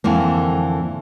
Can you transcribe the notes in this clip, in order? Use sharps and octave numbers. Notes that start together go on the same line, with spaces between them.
F2 D3 E3 A#3